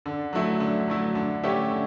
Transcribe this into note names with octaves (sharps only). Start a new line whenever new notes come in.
D3
F#3 A3 E4
D3
F#3 A3 E4
D3
A3 C#4 E4 G4
D3